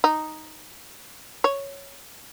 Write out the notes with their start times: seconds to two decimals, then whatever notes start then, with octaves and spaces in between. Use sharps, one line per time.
0.04 D#4
1.44 C#5